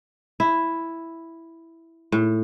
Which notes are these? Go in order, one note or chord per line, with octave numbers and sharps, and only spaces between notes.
E4
A2